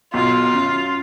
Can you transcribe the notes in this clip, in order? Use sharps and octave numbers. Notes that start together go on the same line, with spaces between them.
B1 F4
F#2